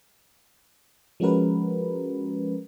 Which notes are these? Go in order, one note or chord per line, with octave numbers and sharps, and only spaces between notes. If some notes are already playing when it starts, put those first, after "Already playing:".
F3 G#3 C#4 F#4 A#4 B4